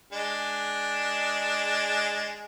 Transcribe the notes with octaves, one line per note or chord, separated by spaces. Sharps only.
G#3 D4